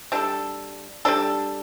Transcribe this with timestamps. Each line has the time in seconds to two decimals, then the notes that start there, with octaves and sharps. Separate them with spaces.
0.12 G3 D4 A4
1.05 G3 D4 A4